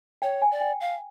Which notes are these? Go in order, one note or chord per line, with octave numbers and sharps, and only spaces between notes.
C#5 G5
G#5
D5
G5
F5